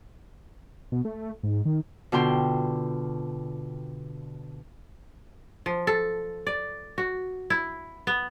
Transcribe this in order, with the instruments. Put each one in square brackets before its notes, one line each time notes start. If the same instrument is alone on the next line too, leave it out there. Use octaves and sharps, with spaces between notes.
[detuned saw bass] B2
A3
G#2
D#3
[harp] B2 D3 F4 G5 C6
[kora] F3
A4
D5
F#4
E4
B3